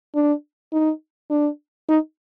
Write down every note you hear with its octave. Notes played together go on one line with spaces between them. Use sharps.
D4
D#4
D4
D#4